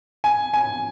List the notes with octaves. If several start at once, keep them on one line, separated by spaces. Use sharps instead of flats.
G#5
G#5